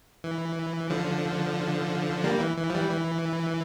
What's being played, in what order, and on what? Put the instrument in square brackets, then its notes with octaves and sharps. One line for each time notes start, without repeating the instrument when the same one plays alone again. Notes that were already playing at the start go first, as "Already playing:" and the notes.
[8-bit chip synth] E3
D3 F3
G3 A#3
E3
E3
F3
E3 G3
E3